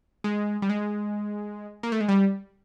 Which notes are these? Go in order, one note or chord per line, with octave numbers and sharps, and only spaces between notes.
G#3
G3
G#3
A#3
A3
G#3
G3